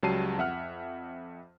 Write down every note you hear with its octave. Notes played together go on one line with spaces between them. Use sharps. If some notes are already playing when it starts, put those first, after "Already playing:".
C#2 F#3 G3 A5 C7 D#7
F2 E5 F#5 F6